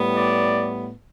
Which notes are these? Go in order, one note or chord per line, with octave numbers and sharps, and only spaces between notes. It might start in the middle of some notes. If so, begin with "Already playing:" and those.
Already playing: A2 G3 B3
D5